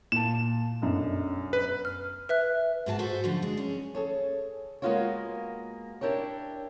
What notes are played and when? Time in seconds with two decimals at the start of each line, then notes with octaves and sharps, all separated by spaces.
0.12 A#2 A5 E7
0.82 B1 F#2 D4
1.53 B4
1.85 F6
2.29 B4 E5 F#6
2.86 G#2 A#3 F#4 B4 A5
2.99 F#4 A4 B4 C5
3.24 F#2 D3 F3 A3
3.42 G#3 D4
3.57 C#4
3.95 G#4 A4 C#5
4.82 G#3 A#3 B3 F4 F#4 C#5
6.01 D4 E4 G4 A#4 C#5